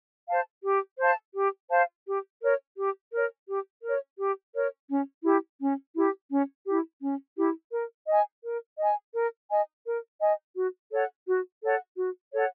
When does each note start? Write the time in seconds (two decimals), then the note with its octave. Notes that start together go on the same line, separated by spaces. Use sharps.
0.29 C5 F5 A5
0.65 G4
0.99 C5 F5 A5
1.34 G4
1.70 C5 F5 A5
2.06 G4
2.42 A#4 C#5
2.76 G4
3.12 A#4 C#5
3.48 G4
3.83 A#4 C#5
4.19 G4
4.54 A#4 C#5
4.89 C#4
5.24 E4 G4
5.60 C#4
5.95 E4 G4
6.31 C#4
6.66 E4 G4
7.02 C#4
7.37 E4 G4
7.72 A#4
8.08 D#5 G#5
8.44 A#4
8.78 D#5 G#5
9.14 A#4
9.49 D#5 G#5
9.85 A#4
10.20 D#5 G#5
10.56 F#4
10.92 A4 C#5 F#5
11.27 F#4
11.63 A4 C#5 F#5
11.97 F#4
12.33 A4 C#5 F#5